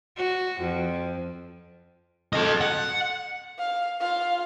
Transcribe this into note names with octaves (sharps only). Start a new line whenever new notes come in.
F#4
F2
A4 D#5
F#5
F5
F4 F5